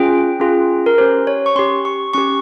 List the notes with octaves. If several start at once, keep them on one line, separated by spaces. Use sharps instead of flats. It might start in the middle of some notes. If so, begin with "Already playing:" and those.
Already playing: C#4 F4 G#4 G5
C#4 F4 G#4
A#4
C#4 G4 C5
C#5
C#6
C#4 G4 C6
C#6
C#4 G4 C#6